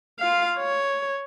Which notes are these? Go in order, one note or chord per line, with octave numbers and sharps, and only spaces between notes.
F4 F5
C#5